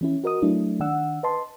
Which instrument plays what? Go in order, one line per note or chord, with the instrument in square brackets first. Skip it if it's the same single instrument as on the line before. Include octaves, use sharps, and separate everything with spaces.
[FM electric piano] E3 C#4 E4
F#4 A#4 D#5 D#6
F#3 A3 D4 E4
D#3 D4 F#5 E6
B4 D#5 A5 C6